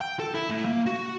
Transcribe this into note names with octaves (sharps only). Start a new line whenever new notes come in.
G5
A4
E4
A2
A#3
F#4